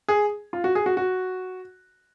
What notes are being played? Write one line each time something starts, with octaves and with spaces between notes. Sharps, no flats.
G#4
F4
F#4
G#4
F#4
F#4